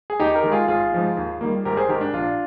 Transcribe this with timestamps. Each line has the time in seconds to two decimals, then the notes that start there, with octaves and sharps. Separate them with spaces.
0.10 G#4
0.20 D#2 D#4 G4
0.35 G4 A#4
0.43 D#3 G#3
0.52 F4 G#4
0.68 G#1 F4 G#4
0.92 G#2 F3 G#3
1.17 D#2
1.41 D#3 G3 A#3
1.65 G#1 G4 A#4
1.77 G#4 C5
1.89 G#2 D#3 G4 A#4
2.01 D4
2.13 A#1 D4 F4